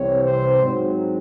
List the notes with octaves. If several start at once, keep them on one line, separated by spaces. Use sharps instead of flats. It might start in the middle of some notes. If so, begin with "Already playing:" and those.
Already playing: C2 C3 E3 C4 C#5
C5
G#2 F#3 C4